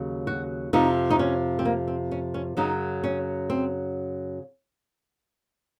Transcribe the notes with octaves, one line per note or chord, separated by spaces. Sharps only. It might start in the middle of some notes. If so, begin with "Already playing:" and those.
Already playing: D#2 C#3 F#3
F#4
F2 C3 F3 D#4
D#4
C#4
C4
A#3
C4
C#4
C#4
F#2 C#3 F#3 D#4
C#4
C4